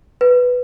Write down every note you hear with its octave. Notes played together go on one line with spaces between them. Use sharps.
B4